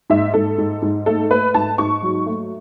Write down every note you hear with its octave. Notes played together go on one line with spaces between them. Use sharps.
G#2 E5
G#2 A4
G#2
G#2
A3 A4
A3 B4
G#2 A5
G#2 C#6
F#3
A3